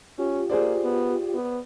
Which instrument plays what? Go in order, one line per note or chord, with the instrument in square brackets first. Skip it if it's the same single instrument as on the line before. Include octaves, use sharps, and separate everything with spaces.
[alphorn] C#4 [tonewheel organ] F4 G4
[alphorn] A#3 [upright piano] G#4 C5 D5
[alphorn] B3
B3